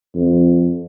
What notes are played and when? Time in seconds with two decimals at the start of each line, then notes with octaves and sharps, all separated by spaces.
0.15 F2